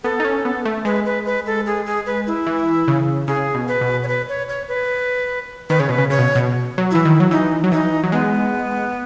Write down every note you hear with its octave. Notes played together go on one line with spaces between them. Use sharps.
B3 A4
D#4
C#4
B3
A3
G#3 B4
B4
B4
A4
G#4
G#4
B4
E4
E3
C#3
C#3 G#4
B2
B4
B2
C#5
B4
C#5
C#5
B4
D#3 B4
C#3 C#5
B2 B4
C#3
C#3 C#5
B2
B2
F#3
E3 E4
D#3
F#3
E3 D#4
F#3
E3 D#4
F#3
G#3 B3